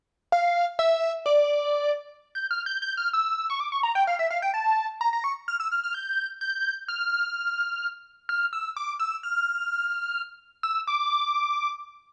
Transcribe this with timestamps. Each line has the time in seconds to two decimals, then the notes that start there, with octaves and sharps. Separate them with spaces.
0.32 F5
0.79 E5
1.26 D5
2.35 G6
2.51 F6
2.66 G6
2.82 G6
2.97 F6
3.13 E6
3.50 C#6
3.60 D6
3.72 C#6
3.83 A#5
3.95 G5
4.07 F5
4.19 E5
4.30 F5
4.42 G5
4.54 A5
5.01 A#5
5.13 A#5
5.24 C#6
5.48 F6
5.60 E6
5.72 F6
5.84 F6
5.94 G6
6.41 G6
6.88 F6
8.29 F6
8.53 E6
8.77 D6
8.99 E6
9.23 F6
10.63 E6
10.87 D6